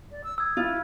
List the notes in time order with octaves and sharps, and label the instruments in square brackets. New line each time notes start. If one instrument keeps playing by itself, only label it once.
[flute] D5
E6
[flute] D#6 [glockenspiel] E6 G#6
[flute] E4 [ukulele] F4